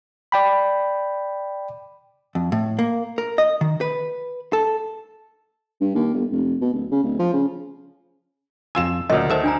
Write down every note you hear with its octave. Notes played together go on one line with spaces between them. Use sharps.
D5 G5 B5
F2
A2
A#3
A#4
D#5
D#3
B4
A4
G2
D#2
G1
F1
B2
D1
C#3
D1
F3
C#3
F2 F4 G#5 E6 E7
D2 A#2 C#3 F#3 A#4 D#5
D#3 A4 C5 E5 A5
D4 G#5 A#5